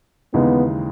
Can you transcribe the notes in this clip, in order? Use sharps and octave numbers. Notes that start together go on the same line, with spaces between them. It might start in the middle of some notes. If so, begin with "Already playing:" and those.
D#2 C#3 E3 G#3 B3 D#4